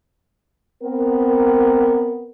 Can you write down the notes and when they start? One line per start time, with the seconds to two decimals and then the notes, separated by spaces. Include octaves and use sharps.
0.83 B3 C4 A#4